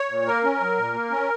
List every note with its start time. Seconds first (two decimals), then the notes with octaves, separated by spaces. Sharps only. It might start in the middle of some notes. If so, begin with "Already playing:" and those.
Already playing: C#5
0.10 A#2
0.26 A#3 A#4
0.44 C#4
0.60 F#3
0.78 A#2
0.94 A#3
1.11 C#4